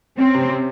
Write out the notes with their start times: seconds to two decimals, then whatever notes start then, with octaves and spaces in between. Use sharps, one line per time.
0.18 C4 C#4
0.34 C3
0.49 C3